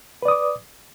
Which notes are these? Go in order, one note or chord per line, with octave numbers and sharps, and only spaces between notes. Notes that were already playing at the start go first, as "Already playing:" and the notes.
B4 D5 D6 D#6